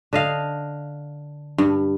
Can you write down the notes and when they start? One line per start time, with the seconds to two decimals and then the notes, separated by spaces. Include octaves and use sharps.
0.13 D3 D#5 F5
1.58 G2